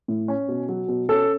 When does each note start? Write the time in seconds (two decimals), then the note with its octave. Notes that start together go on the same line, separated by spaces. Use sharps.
0.08 A2
0.28 C#4
0.48 B2
0.69 F#3
0.88 B2
1.09 C#4 A4